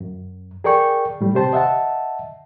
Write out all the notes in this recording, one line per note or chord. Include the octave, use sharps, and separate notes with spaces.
F#2
G#4 A#4 D5 G5 C#6
A2 G3
C3 G4 C5 A5
D#5 E5 F#5 A5